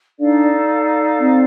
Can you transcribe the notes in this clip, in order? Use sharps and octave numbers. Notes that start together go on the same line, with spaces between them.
D4 D#4 A4 D5 F5
C4